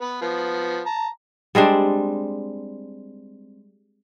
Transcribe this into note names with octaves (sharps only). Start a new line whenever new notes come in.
B3 B4
F3 B3
A5 A#5
G3 G#3 C4 D4